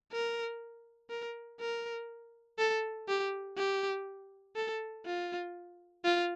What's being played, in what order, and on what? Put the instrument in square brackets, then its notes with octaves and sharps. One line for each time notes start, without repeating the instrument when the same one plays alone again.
[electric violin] A#4
A#4
A#4
A4
G4
G4
A4
F4
F4